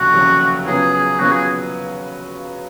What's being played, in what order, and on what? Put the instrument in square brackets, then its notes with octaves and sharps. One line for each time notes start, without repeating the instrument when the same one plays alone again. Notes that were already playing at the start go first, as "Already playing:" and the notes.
Already playing: [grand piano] F1 D#2 C#3 F#3 [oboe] F#4
[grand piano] F1 D#2 C#3 F#3
[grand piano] C#3 F#3 B3 F4 B4 [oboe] G#4
[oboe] G#4
[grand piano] C#3 F#3 B3 F4 B4 [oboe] F#4
[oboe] G#4